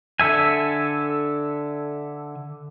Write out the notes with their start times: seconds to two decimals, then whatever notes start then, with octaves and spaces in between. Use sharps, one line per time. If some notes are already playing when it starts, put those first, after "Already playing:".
0.20 D3 A4 E5 G#5